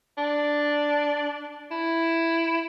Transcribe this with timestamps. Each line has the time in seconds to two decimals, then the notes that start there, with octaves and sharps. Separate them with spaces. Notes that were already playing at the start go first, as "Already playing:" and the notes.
0.18 D4
1.71 E4